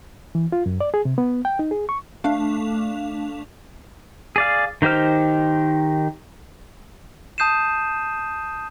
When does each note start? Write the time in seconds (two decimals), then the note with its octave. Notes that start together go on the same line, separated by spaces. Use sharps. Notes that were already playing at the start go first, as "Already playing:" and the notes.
0.35 E3
0.52 F4
0.66 F#2
0.81 D5
0.94 G#4
1.05 C3
1.18 B3
1.45 G5
1.59 D#4
1.71 G#4
1.89 C#6
2.24 A3 D4 F5
4.36 G#4 D5 F5
4.82 D#3 D#4 G4 C5 F6
7.38 A5 D#6 G6 C7 D#7 E7